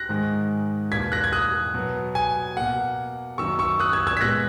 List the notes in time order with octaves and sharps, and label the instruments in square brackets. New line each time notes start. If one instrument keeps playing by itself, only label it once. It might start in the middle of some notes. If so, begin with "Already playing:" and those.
Already playing: [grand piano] F#6 A#6
G#2 D#3 G#3
E2 B2 A#3 G#6 B6
F#6 A#6
G#6
D#6 F#6
B2 F#3 B3
G#5
B2 A#3 F#5
F#2 D#3 F#3 A#3 C#6 E6
C#6 E6
D#6 F#6
E6 G#6
E6 G#6
B6
A#2 G#3 B3 F#6 A#6